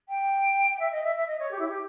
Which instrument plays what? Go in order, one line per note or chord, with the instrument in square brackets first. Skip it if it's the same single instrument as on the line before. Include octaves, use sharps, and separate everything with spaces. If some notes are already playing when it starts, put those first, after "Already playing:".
[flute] G5
G5
E5
D#5
E5
E5
D#5
C#5
G4
E4
G4